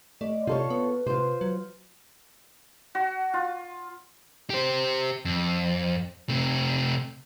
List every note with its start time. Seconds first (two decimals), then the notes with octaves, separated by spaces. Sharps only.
0.21 A3 D5 D#5
0.47 C3 F4 A4 C#5
0.70 B3 B4
1.06 C3 F4 C5
1.41 F#3
2.95 F#4
3.34 F4
4.50 G4 C5
5.25 F2
6.29 C3 A3